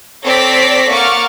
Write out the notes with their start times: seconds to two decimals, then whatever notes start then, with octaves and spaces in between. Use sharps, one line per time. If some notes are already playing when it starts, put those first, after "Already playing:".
0.24 C4 A4 C#5 D5 A#6 B6
0.91 A#3 F#5 C#6 D6 F6 A6